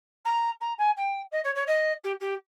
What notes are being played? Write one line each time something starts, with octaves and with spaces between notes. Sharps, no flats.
A#5
A#5
G#5
G5
D#5
C#5
C#5
D#5
G4
G4